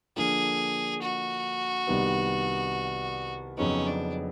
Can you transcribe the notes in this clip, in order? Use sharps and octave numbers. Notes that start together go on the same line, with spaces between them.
D3 F3 A#3 D4 F4 G#4
F#4
C2 C3 D#3 G3 B3
F2 C#3 F#3 B3 C#4 D#4
D4